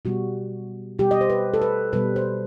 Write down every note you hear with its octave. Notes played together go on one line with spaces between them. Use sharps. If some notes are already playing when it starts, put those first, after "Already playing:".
B2 G3 F#4
B2 G3 G4
D#5
C5
B4
A4
B4
B2 G3 B4
C5